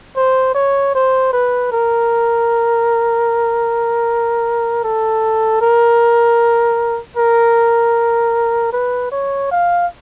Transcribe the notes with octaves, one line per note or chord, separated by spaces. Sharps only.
C5
C#5
C5
B4
A#4
A4
A#4
A#4
B4
C#5
F5